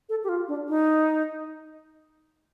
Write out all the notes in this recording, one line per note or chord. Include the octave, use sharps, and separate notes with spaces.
A4
G4
F4
D4
D#4